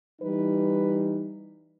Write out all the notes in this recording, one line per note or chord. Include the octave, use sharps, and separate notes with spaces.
E3 G3 D#4 B4